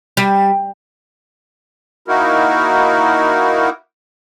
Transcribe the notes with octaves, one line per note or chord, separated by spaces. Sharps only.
G3
A#3 D#4 E4 F#4 A#4